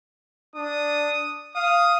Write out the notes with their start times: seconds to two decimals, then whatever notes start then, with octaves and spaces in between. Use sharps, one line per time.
0.55 D4 D#6
1.55 F5 D#6